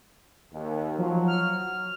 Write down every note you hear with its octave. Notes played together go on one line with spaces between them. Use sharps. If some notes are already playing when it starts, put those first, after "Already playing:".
D#2
F3 F#3
F6